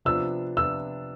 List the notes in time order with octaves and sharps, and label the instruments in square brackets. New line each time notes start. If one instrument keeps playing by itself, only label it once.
[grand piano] C3 F3 B3 D4 F4 [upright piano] E6
[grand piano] C3 F3 B3 D4 F4 [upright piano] E6